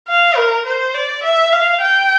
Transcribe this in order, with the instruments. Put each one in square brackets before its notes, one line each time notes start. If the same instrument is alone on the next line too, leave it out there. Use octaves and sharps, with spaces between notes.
[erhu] F5
A#4
C5
D5
E5
F5
G5